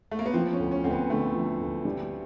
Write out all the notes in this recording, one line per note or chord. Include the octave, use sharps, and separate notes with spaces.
A3
A#3
B3
F3 C4
C#4
D2
C#4
D2 C4
B3
D3 A3
F3
D2
G3